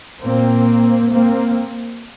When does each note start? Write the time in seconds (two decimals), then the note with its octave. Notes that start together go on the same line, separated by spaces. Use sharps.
0.21 A#2 A#3 C4
1.11 A#3 C4